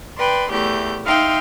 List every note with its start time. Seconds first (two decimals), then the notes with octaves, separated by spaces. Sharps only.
0.17 B4 D5 G5 C6
0.49 E2 A3 G4 G6
1.04 D#4 E5 F5 G5 C6